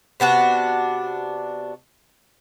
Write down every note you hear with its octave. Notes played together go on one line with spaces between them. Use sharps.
C3 B3 D4 F#4